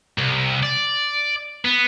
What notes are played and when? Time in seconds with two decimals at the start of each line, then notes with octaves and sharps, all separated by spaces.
0.18 C2
0.63 D5
1.65 B3